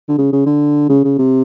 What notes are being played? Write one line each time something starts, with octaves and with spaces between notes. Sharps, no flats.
D3
C#3
C#3
D3
C#3
C#3
C3